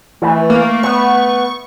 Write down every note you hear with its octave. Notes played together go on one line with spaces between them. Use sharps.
E3 A3
A#3
B3 C#6